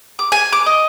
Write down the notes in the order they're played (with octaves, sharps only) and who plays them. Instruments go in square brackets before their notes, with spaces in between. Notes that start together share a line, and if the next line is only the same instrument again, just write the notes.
[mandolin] D6
G#5
D6
D#5